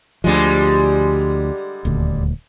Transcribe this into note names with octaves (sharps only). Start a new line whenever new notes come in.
D2 D3 F3 G3 G#3
D#1 D2